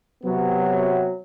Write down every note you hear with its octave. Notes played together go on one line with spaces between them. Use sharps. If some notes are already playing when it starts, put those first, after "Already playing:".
C3 F#3 B3